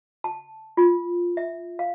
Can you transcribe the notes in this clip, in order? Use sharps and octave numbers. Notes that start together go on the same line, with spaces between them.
A5
F4
E5
F5